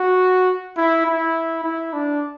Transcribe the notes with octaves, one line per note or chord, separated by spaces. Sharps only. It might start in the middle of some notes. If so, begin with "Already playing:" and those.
Already playing: F#4
E4
E4
E4
D4